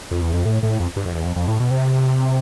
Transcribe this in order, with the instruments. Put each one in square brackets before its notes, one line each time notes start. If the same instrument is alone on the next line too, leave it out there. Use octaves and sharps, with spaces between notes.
[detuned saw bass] F2
E2
F2
A2
A2
F2
G2
F2
E2
F2
F2
A2
B2
C3